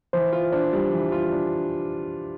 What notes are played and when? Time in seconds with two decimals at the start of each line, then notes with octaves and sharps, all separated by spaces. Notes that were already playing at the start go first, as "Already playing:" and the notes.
0.13 E3 C5
0.33 F4
0.52 D4 C5
0.73 G3
0.92 E3
1.12 F4
1.32 D4